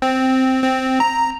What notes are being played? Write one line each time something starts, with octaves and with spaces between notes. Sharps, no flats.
C4
C4
A#5